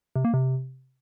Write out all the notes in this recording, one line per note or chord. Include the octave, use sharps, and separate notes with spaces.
C3
A#3
C3